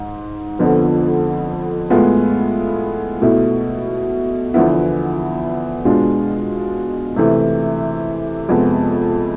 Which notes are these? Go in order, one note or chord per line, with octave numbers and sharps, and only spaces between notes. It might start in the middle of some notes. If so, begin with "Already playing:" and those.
Already playing: G#2
F2 D3 F3 B3
A2 G#3 B3 F4
B2 A3 E4
E2 D3 F3 B3 E4
B2 G#3 D4 F4
C3 E3 A3
F2 C3 G#3 B3